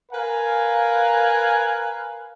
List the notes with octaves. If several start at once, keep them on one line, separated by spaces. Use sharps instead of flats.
A#4 B4 F5 G#5